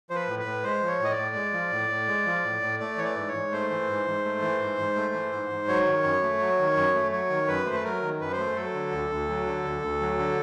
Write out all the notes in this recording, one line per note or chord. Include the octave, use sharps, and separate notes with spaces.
F3 C5
B4
A2
B4
A2
G#3 C5
F3 C#5
A2 D#5
D5
A2
G#3
F3
A2
A2
G#3
F3
A2
A2
A3 D5
E3 C#5
D5
G#2
C#5
G#2
A3 C5
E3
G#2
G#2
A3
E3
G#2
G#2
A3
E3
G#2
G#2
F#3 C#5
D#3
F#2
A3
F#3
D#3
F#2
A3
F#3 C#5
D#3
F#2 B4
A3 C5
B4
F#3 A#4
D#3
F#2 B4
C5
A3
F#3 A4
D3
D2
D2
F#3
D3
D2
D2
F#3
D3